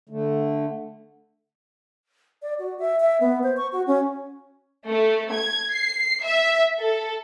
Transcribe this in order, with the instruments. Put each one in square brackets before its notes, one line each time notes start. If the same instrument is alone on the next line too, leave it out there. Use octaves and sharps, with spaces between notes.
[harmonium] D3 A3
[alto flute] D5
F#4
E5
E5
B3
C5
C#6
F#4
C#4
[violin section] A3
G#6
C7
E5
A4